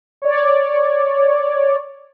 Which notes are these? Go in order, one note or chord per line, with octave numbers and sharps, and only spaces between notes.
C#5 D5